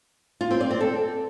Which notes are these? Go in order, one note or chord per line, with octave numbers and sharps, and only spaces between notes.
F4
C4
D5
C4
A4